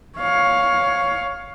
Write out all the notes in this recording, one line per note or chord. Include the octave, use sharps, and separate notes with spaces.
C#5 F5